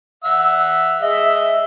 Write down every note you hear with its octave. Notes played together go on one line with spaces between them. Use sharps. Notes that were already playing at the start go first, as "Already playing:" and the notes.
E5 F#5 E6
G#3 D#5 E5